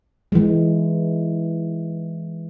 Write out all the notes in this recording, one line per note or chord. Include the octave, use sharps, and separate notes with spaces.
E3 G#3